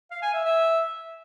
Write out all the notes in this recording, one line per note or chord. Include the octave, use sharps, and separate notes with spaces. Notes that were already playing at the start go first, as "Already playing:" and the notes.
F5
G#5
E5
E5